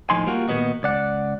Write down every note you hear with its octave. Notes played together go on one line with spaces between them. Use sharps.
D#2 A2 F3 D#4 G#5 C6
G3 A#3 F4 F#4
A#2 D#3 B3 D#4 F#4
C#2 D5 F#5